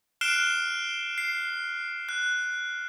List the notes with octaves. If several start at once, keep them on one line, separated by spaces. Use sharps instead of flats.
F6 F#6 C7 D7 E7 G7
C7
F#6